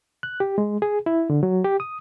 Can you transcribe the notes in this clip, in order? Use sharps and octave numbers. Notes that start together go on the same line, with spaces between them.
F#6
G4
G#3
G#4
E4
D3
F#3
G4
D#6